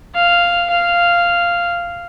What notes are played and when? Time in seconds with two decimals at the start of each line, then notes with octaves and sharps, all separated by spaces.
0.15 F5
0.70 F5